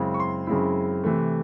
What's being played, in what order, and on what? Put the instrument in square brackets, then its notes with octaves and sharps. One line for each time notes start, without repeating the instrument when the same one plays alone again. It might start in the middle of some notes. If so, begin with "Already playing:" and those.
Already playing: [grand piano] F#2 C#3 G#3 C4 E4
C#6
C6
F#2 C#3 G#3 C4 E4
C3 E3 A3